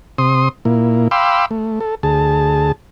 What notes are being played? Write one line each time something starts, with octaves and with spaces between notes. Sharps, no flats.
C3 C6 D#6
A#2 A#3 E4
F5 G5 B5 C6 D6 E6
A3
A4
D2 G#4 A5